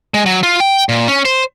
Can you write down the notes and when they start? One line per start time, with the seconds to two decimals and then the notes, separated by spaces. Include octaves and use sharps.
0.14 G#3
0.26 F#3
0.43 F4
0.60 G5
0.89 A#2
1.08 C#4
1.25 C5